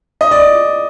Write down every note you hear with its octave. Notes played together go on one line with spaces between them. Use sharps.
D#5
D5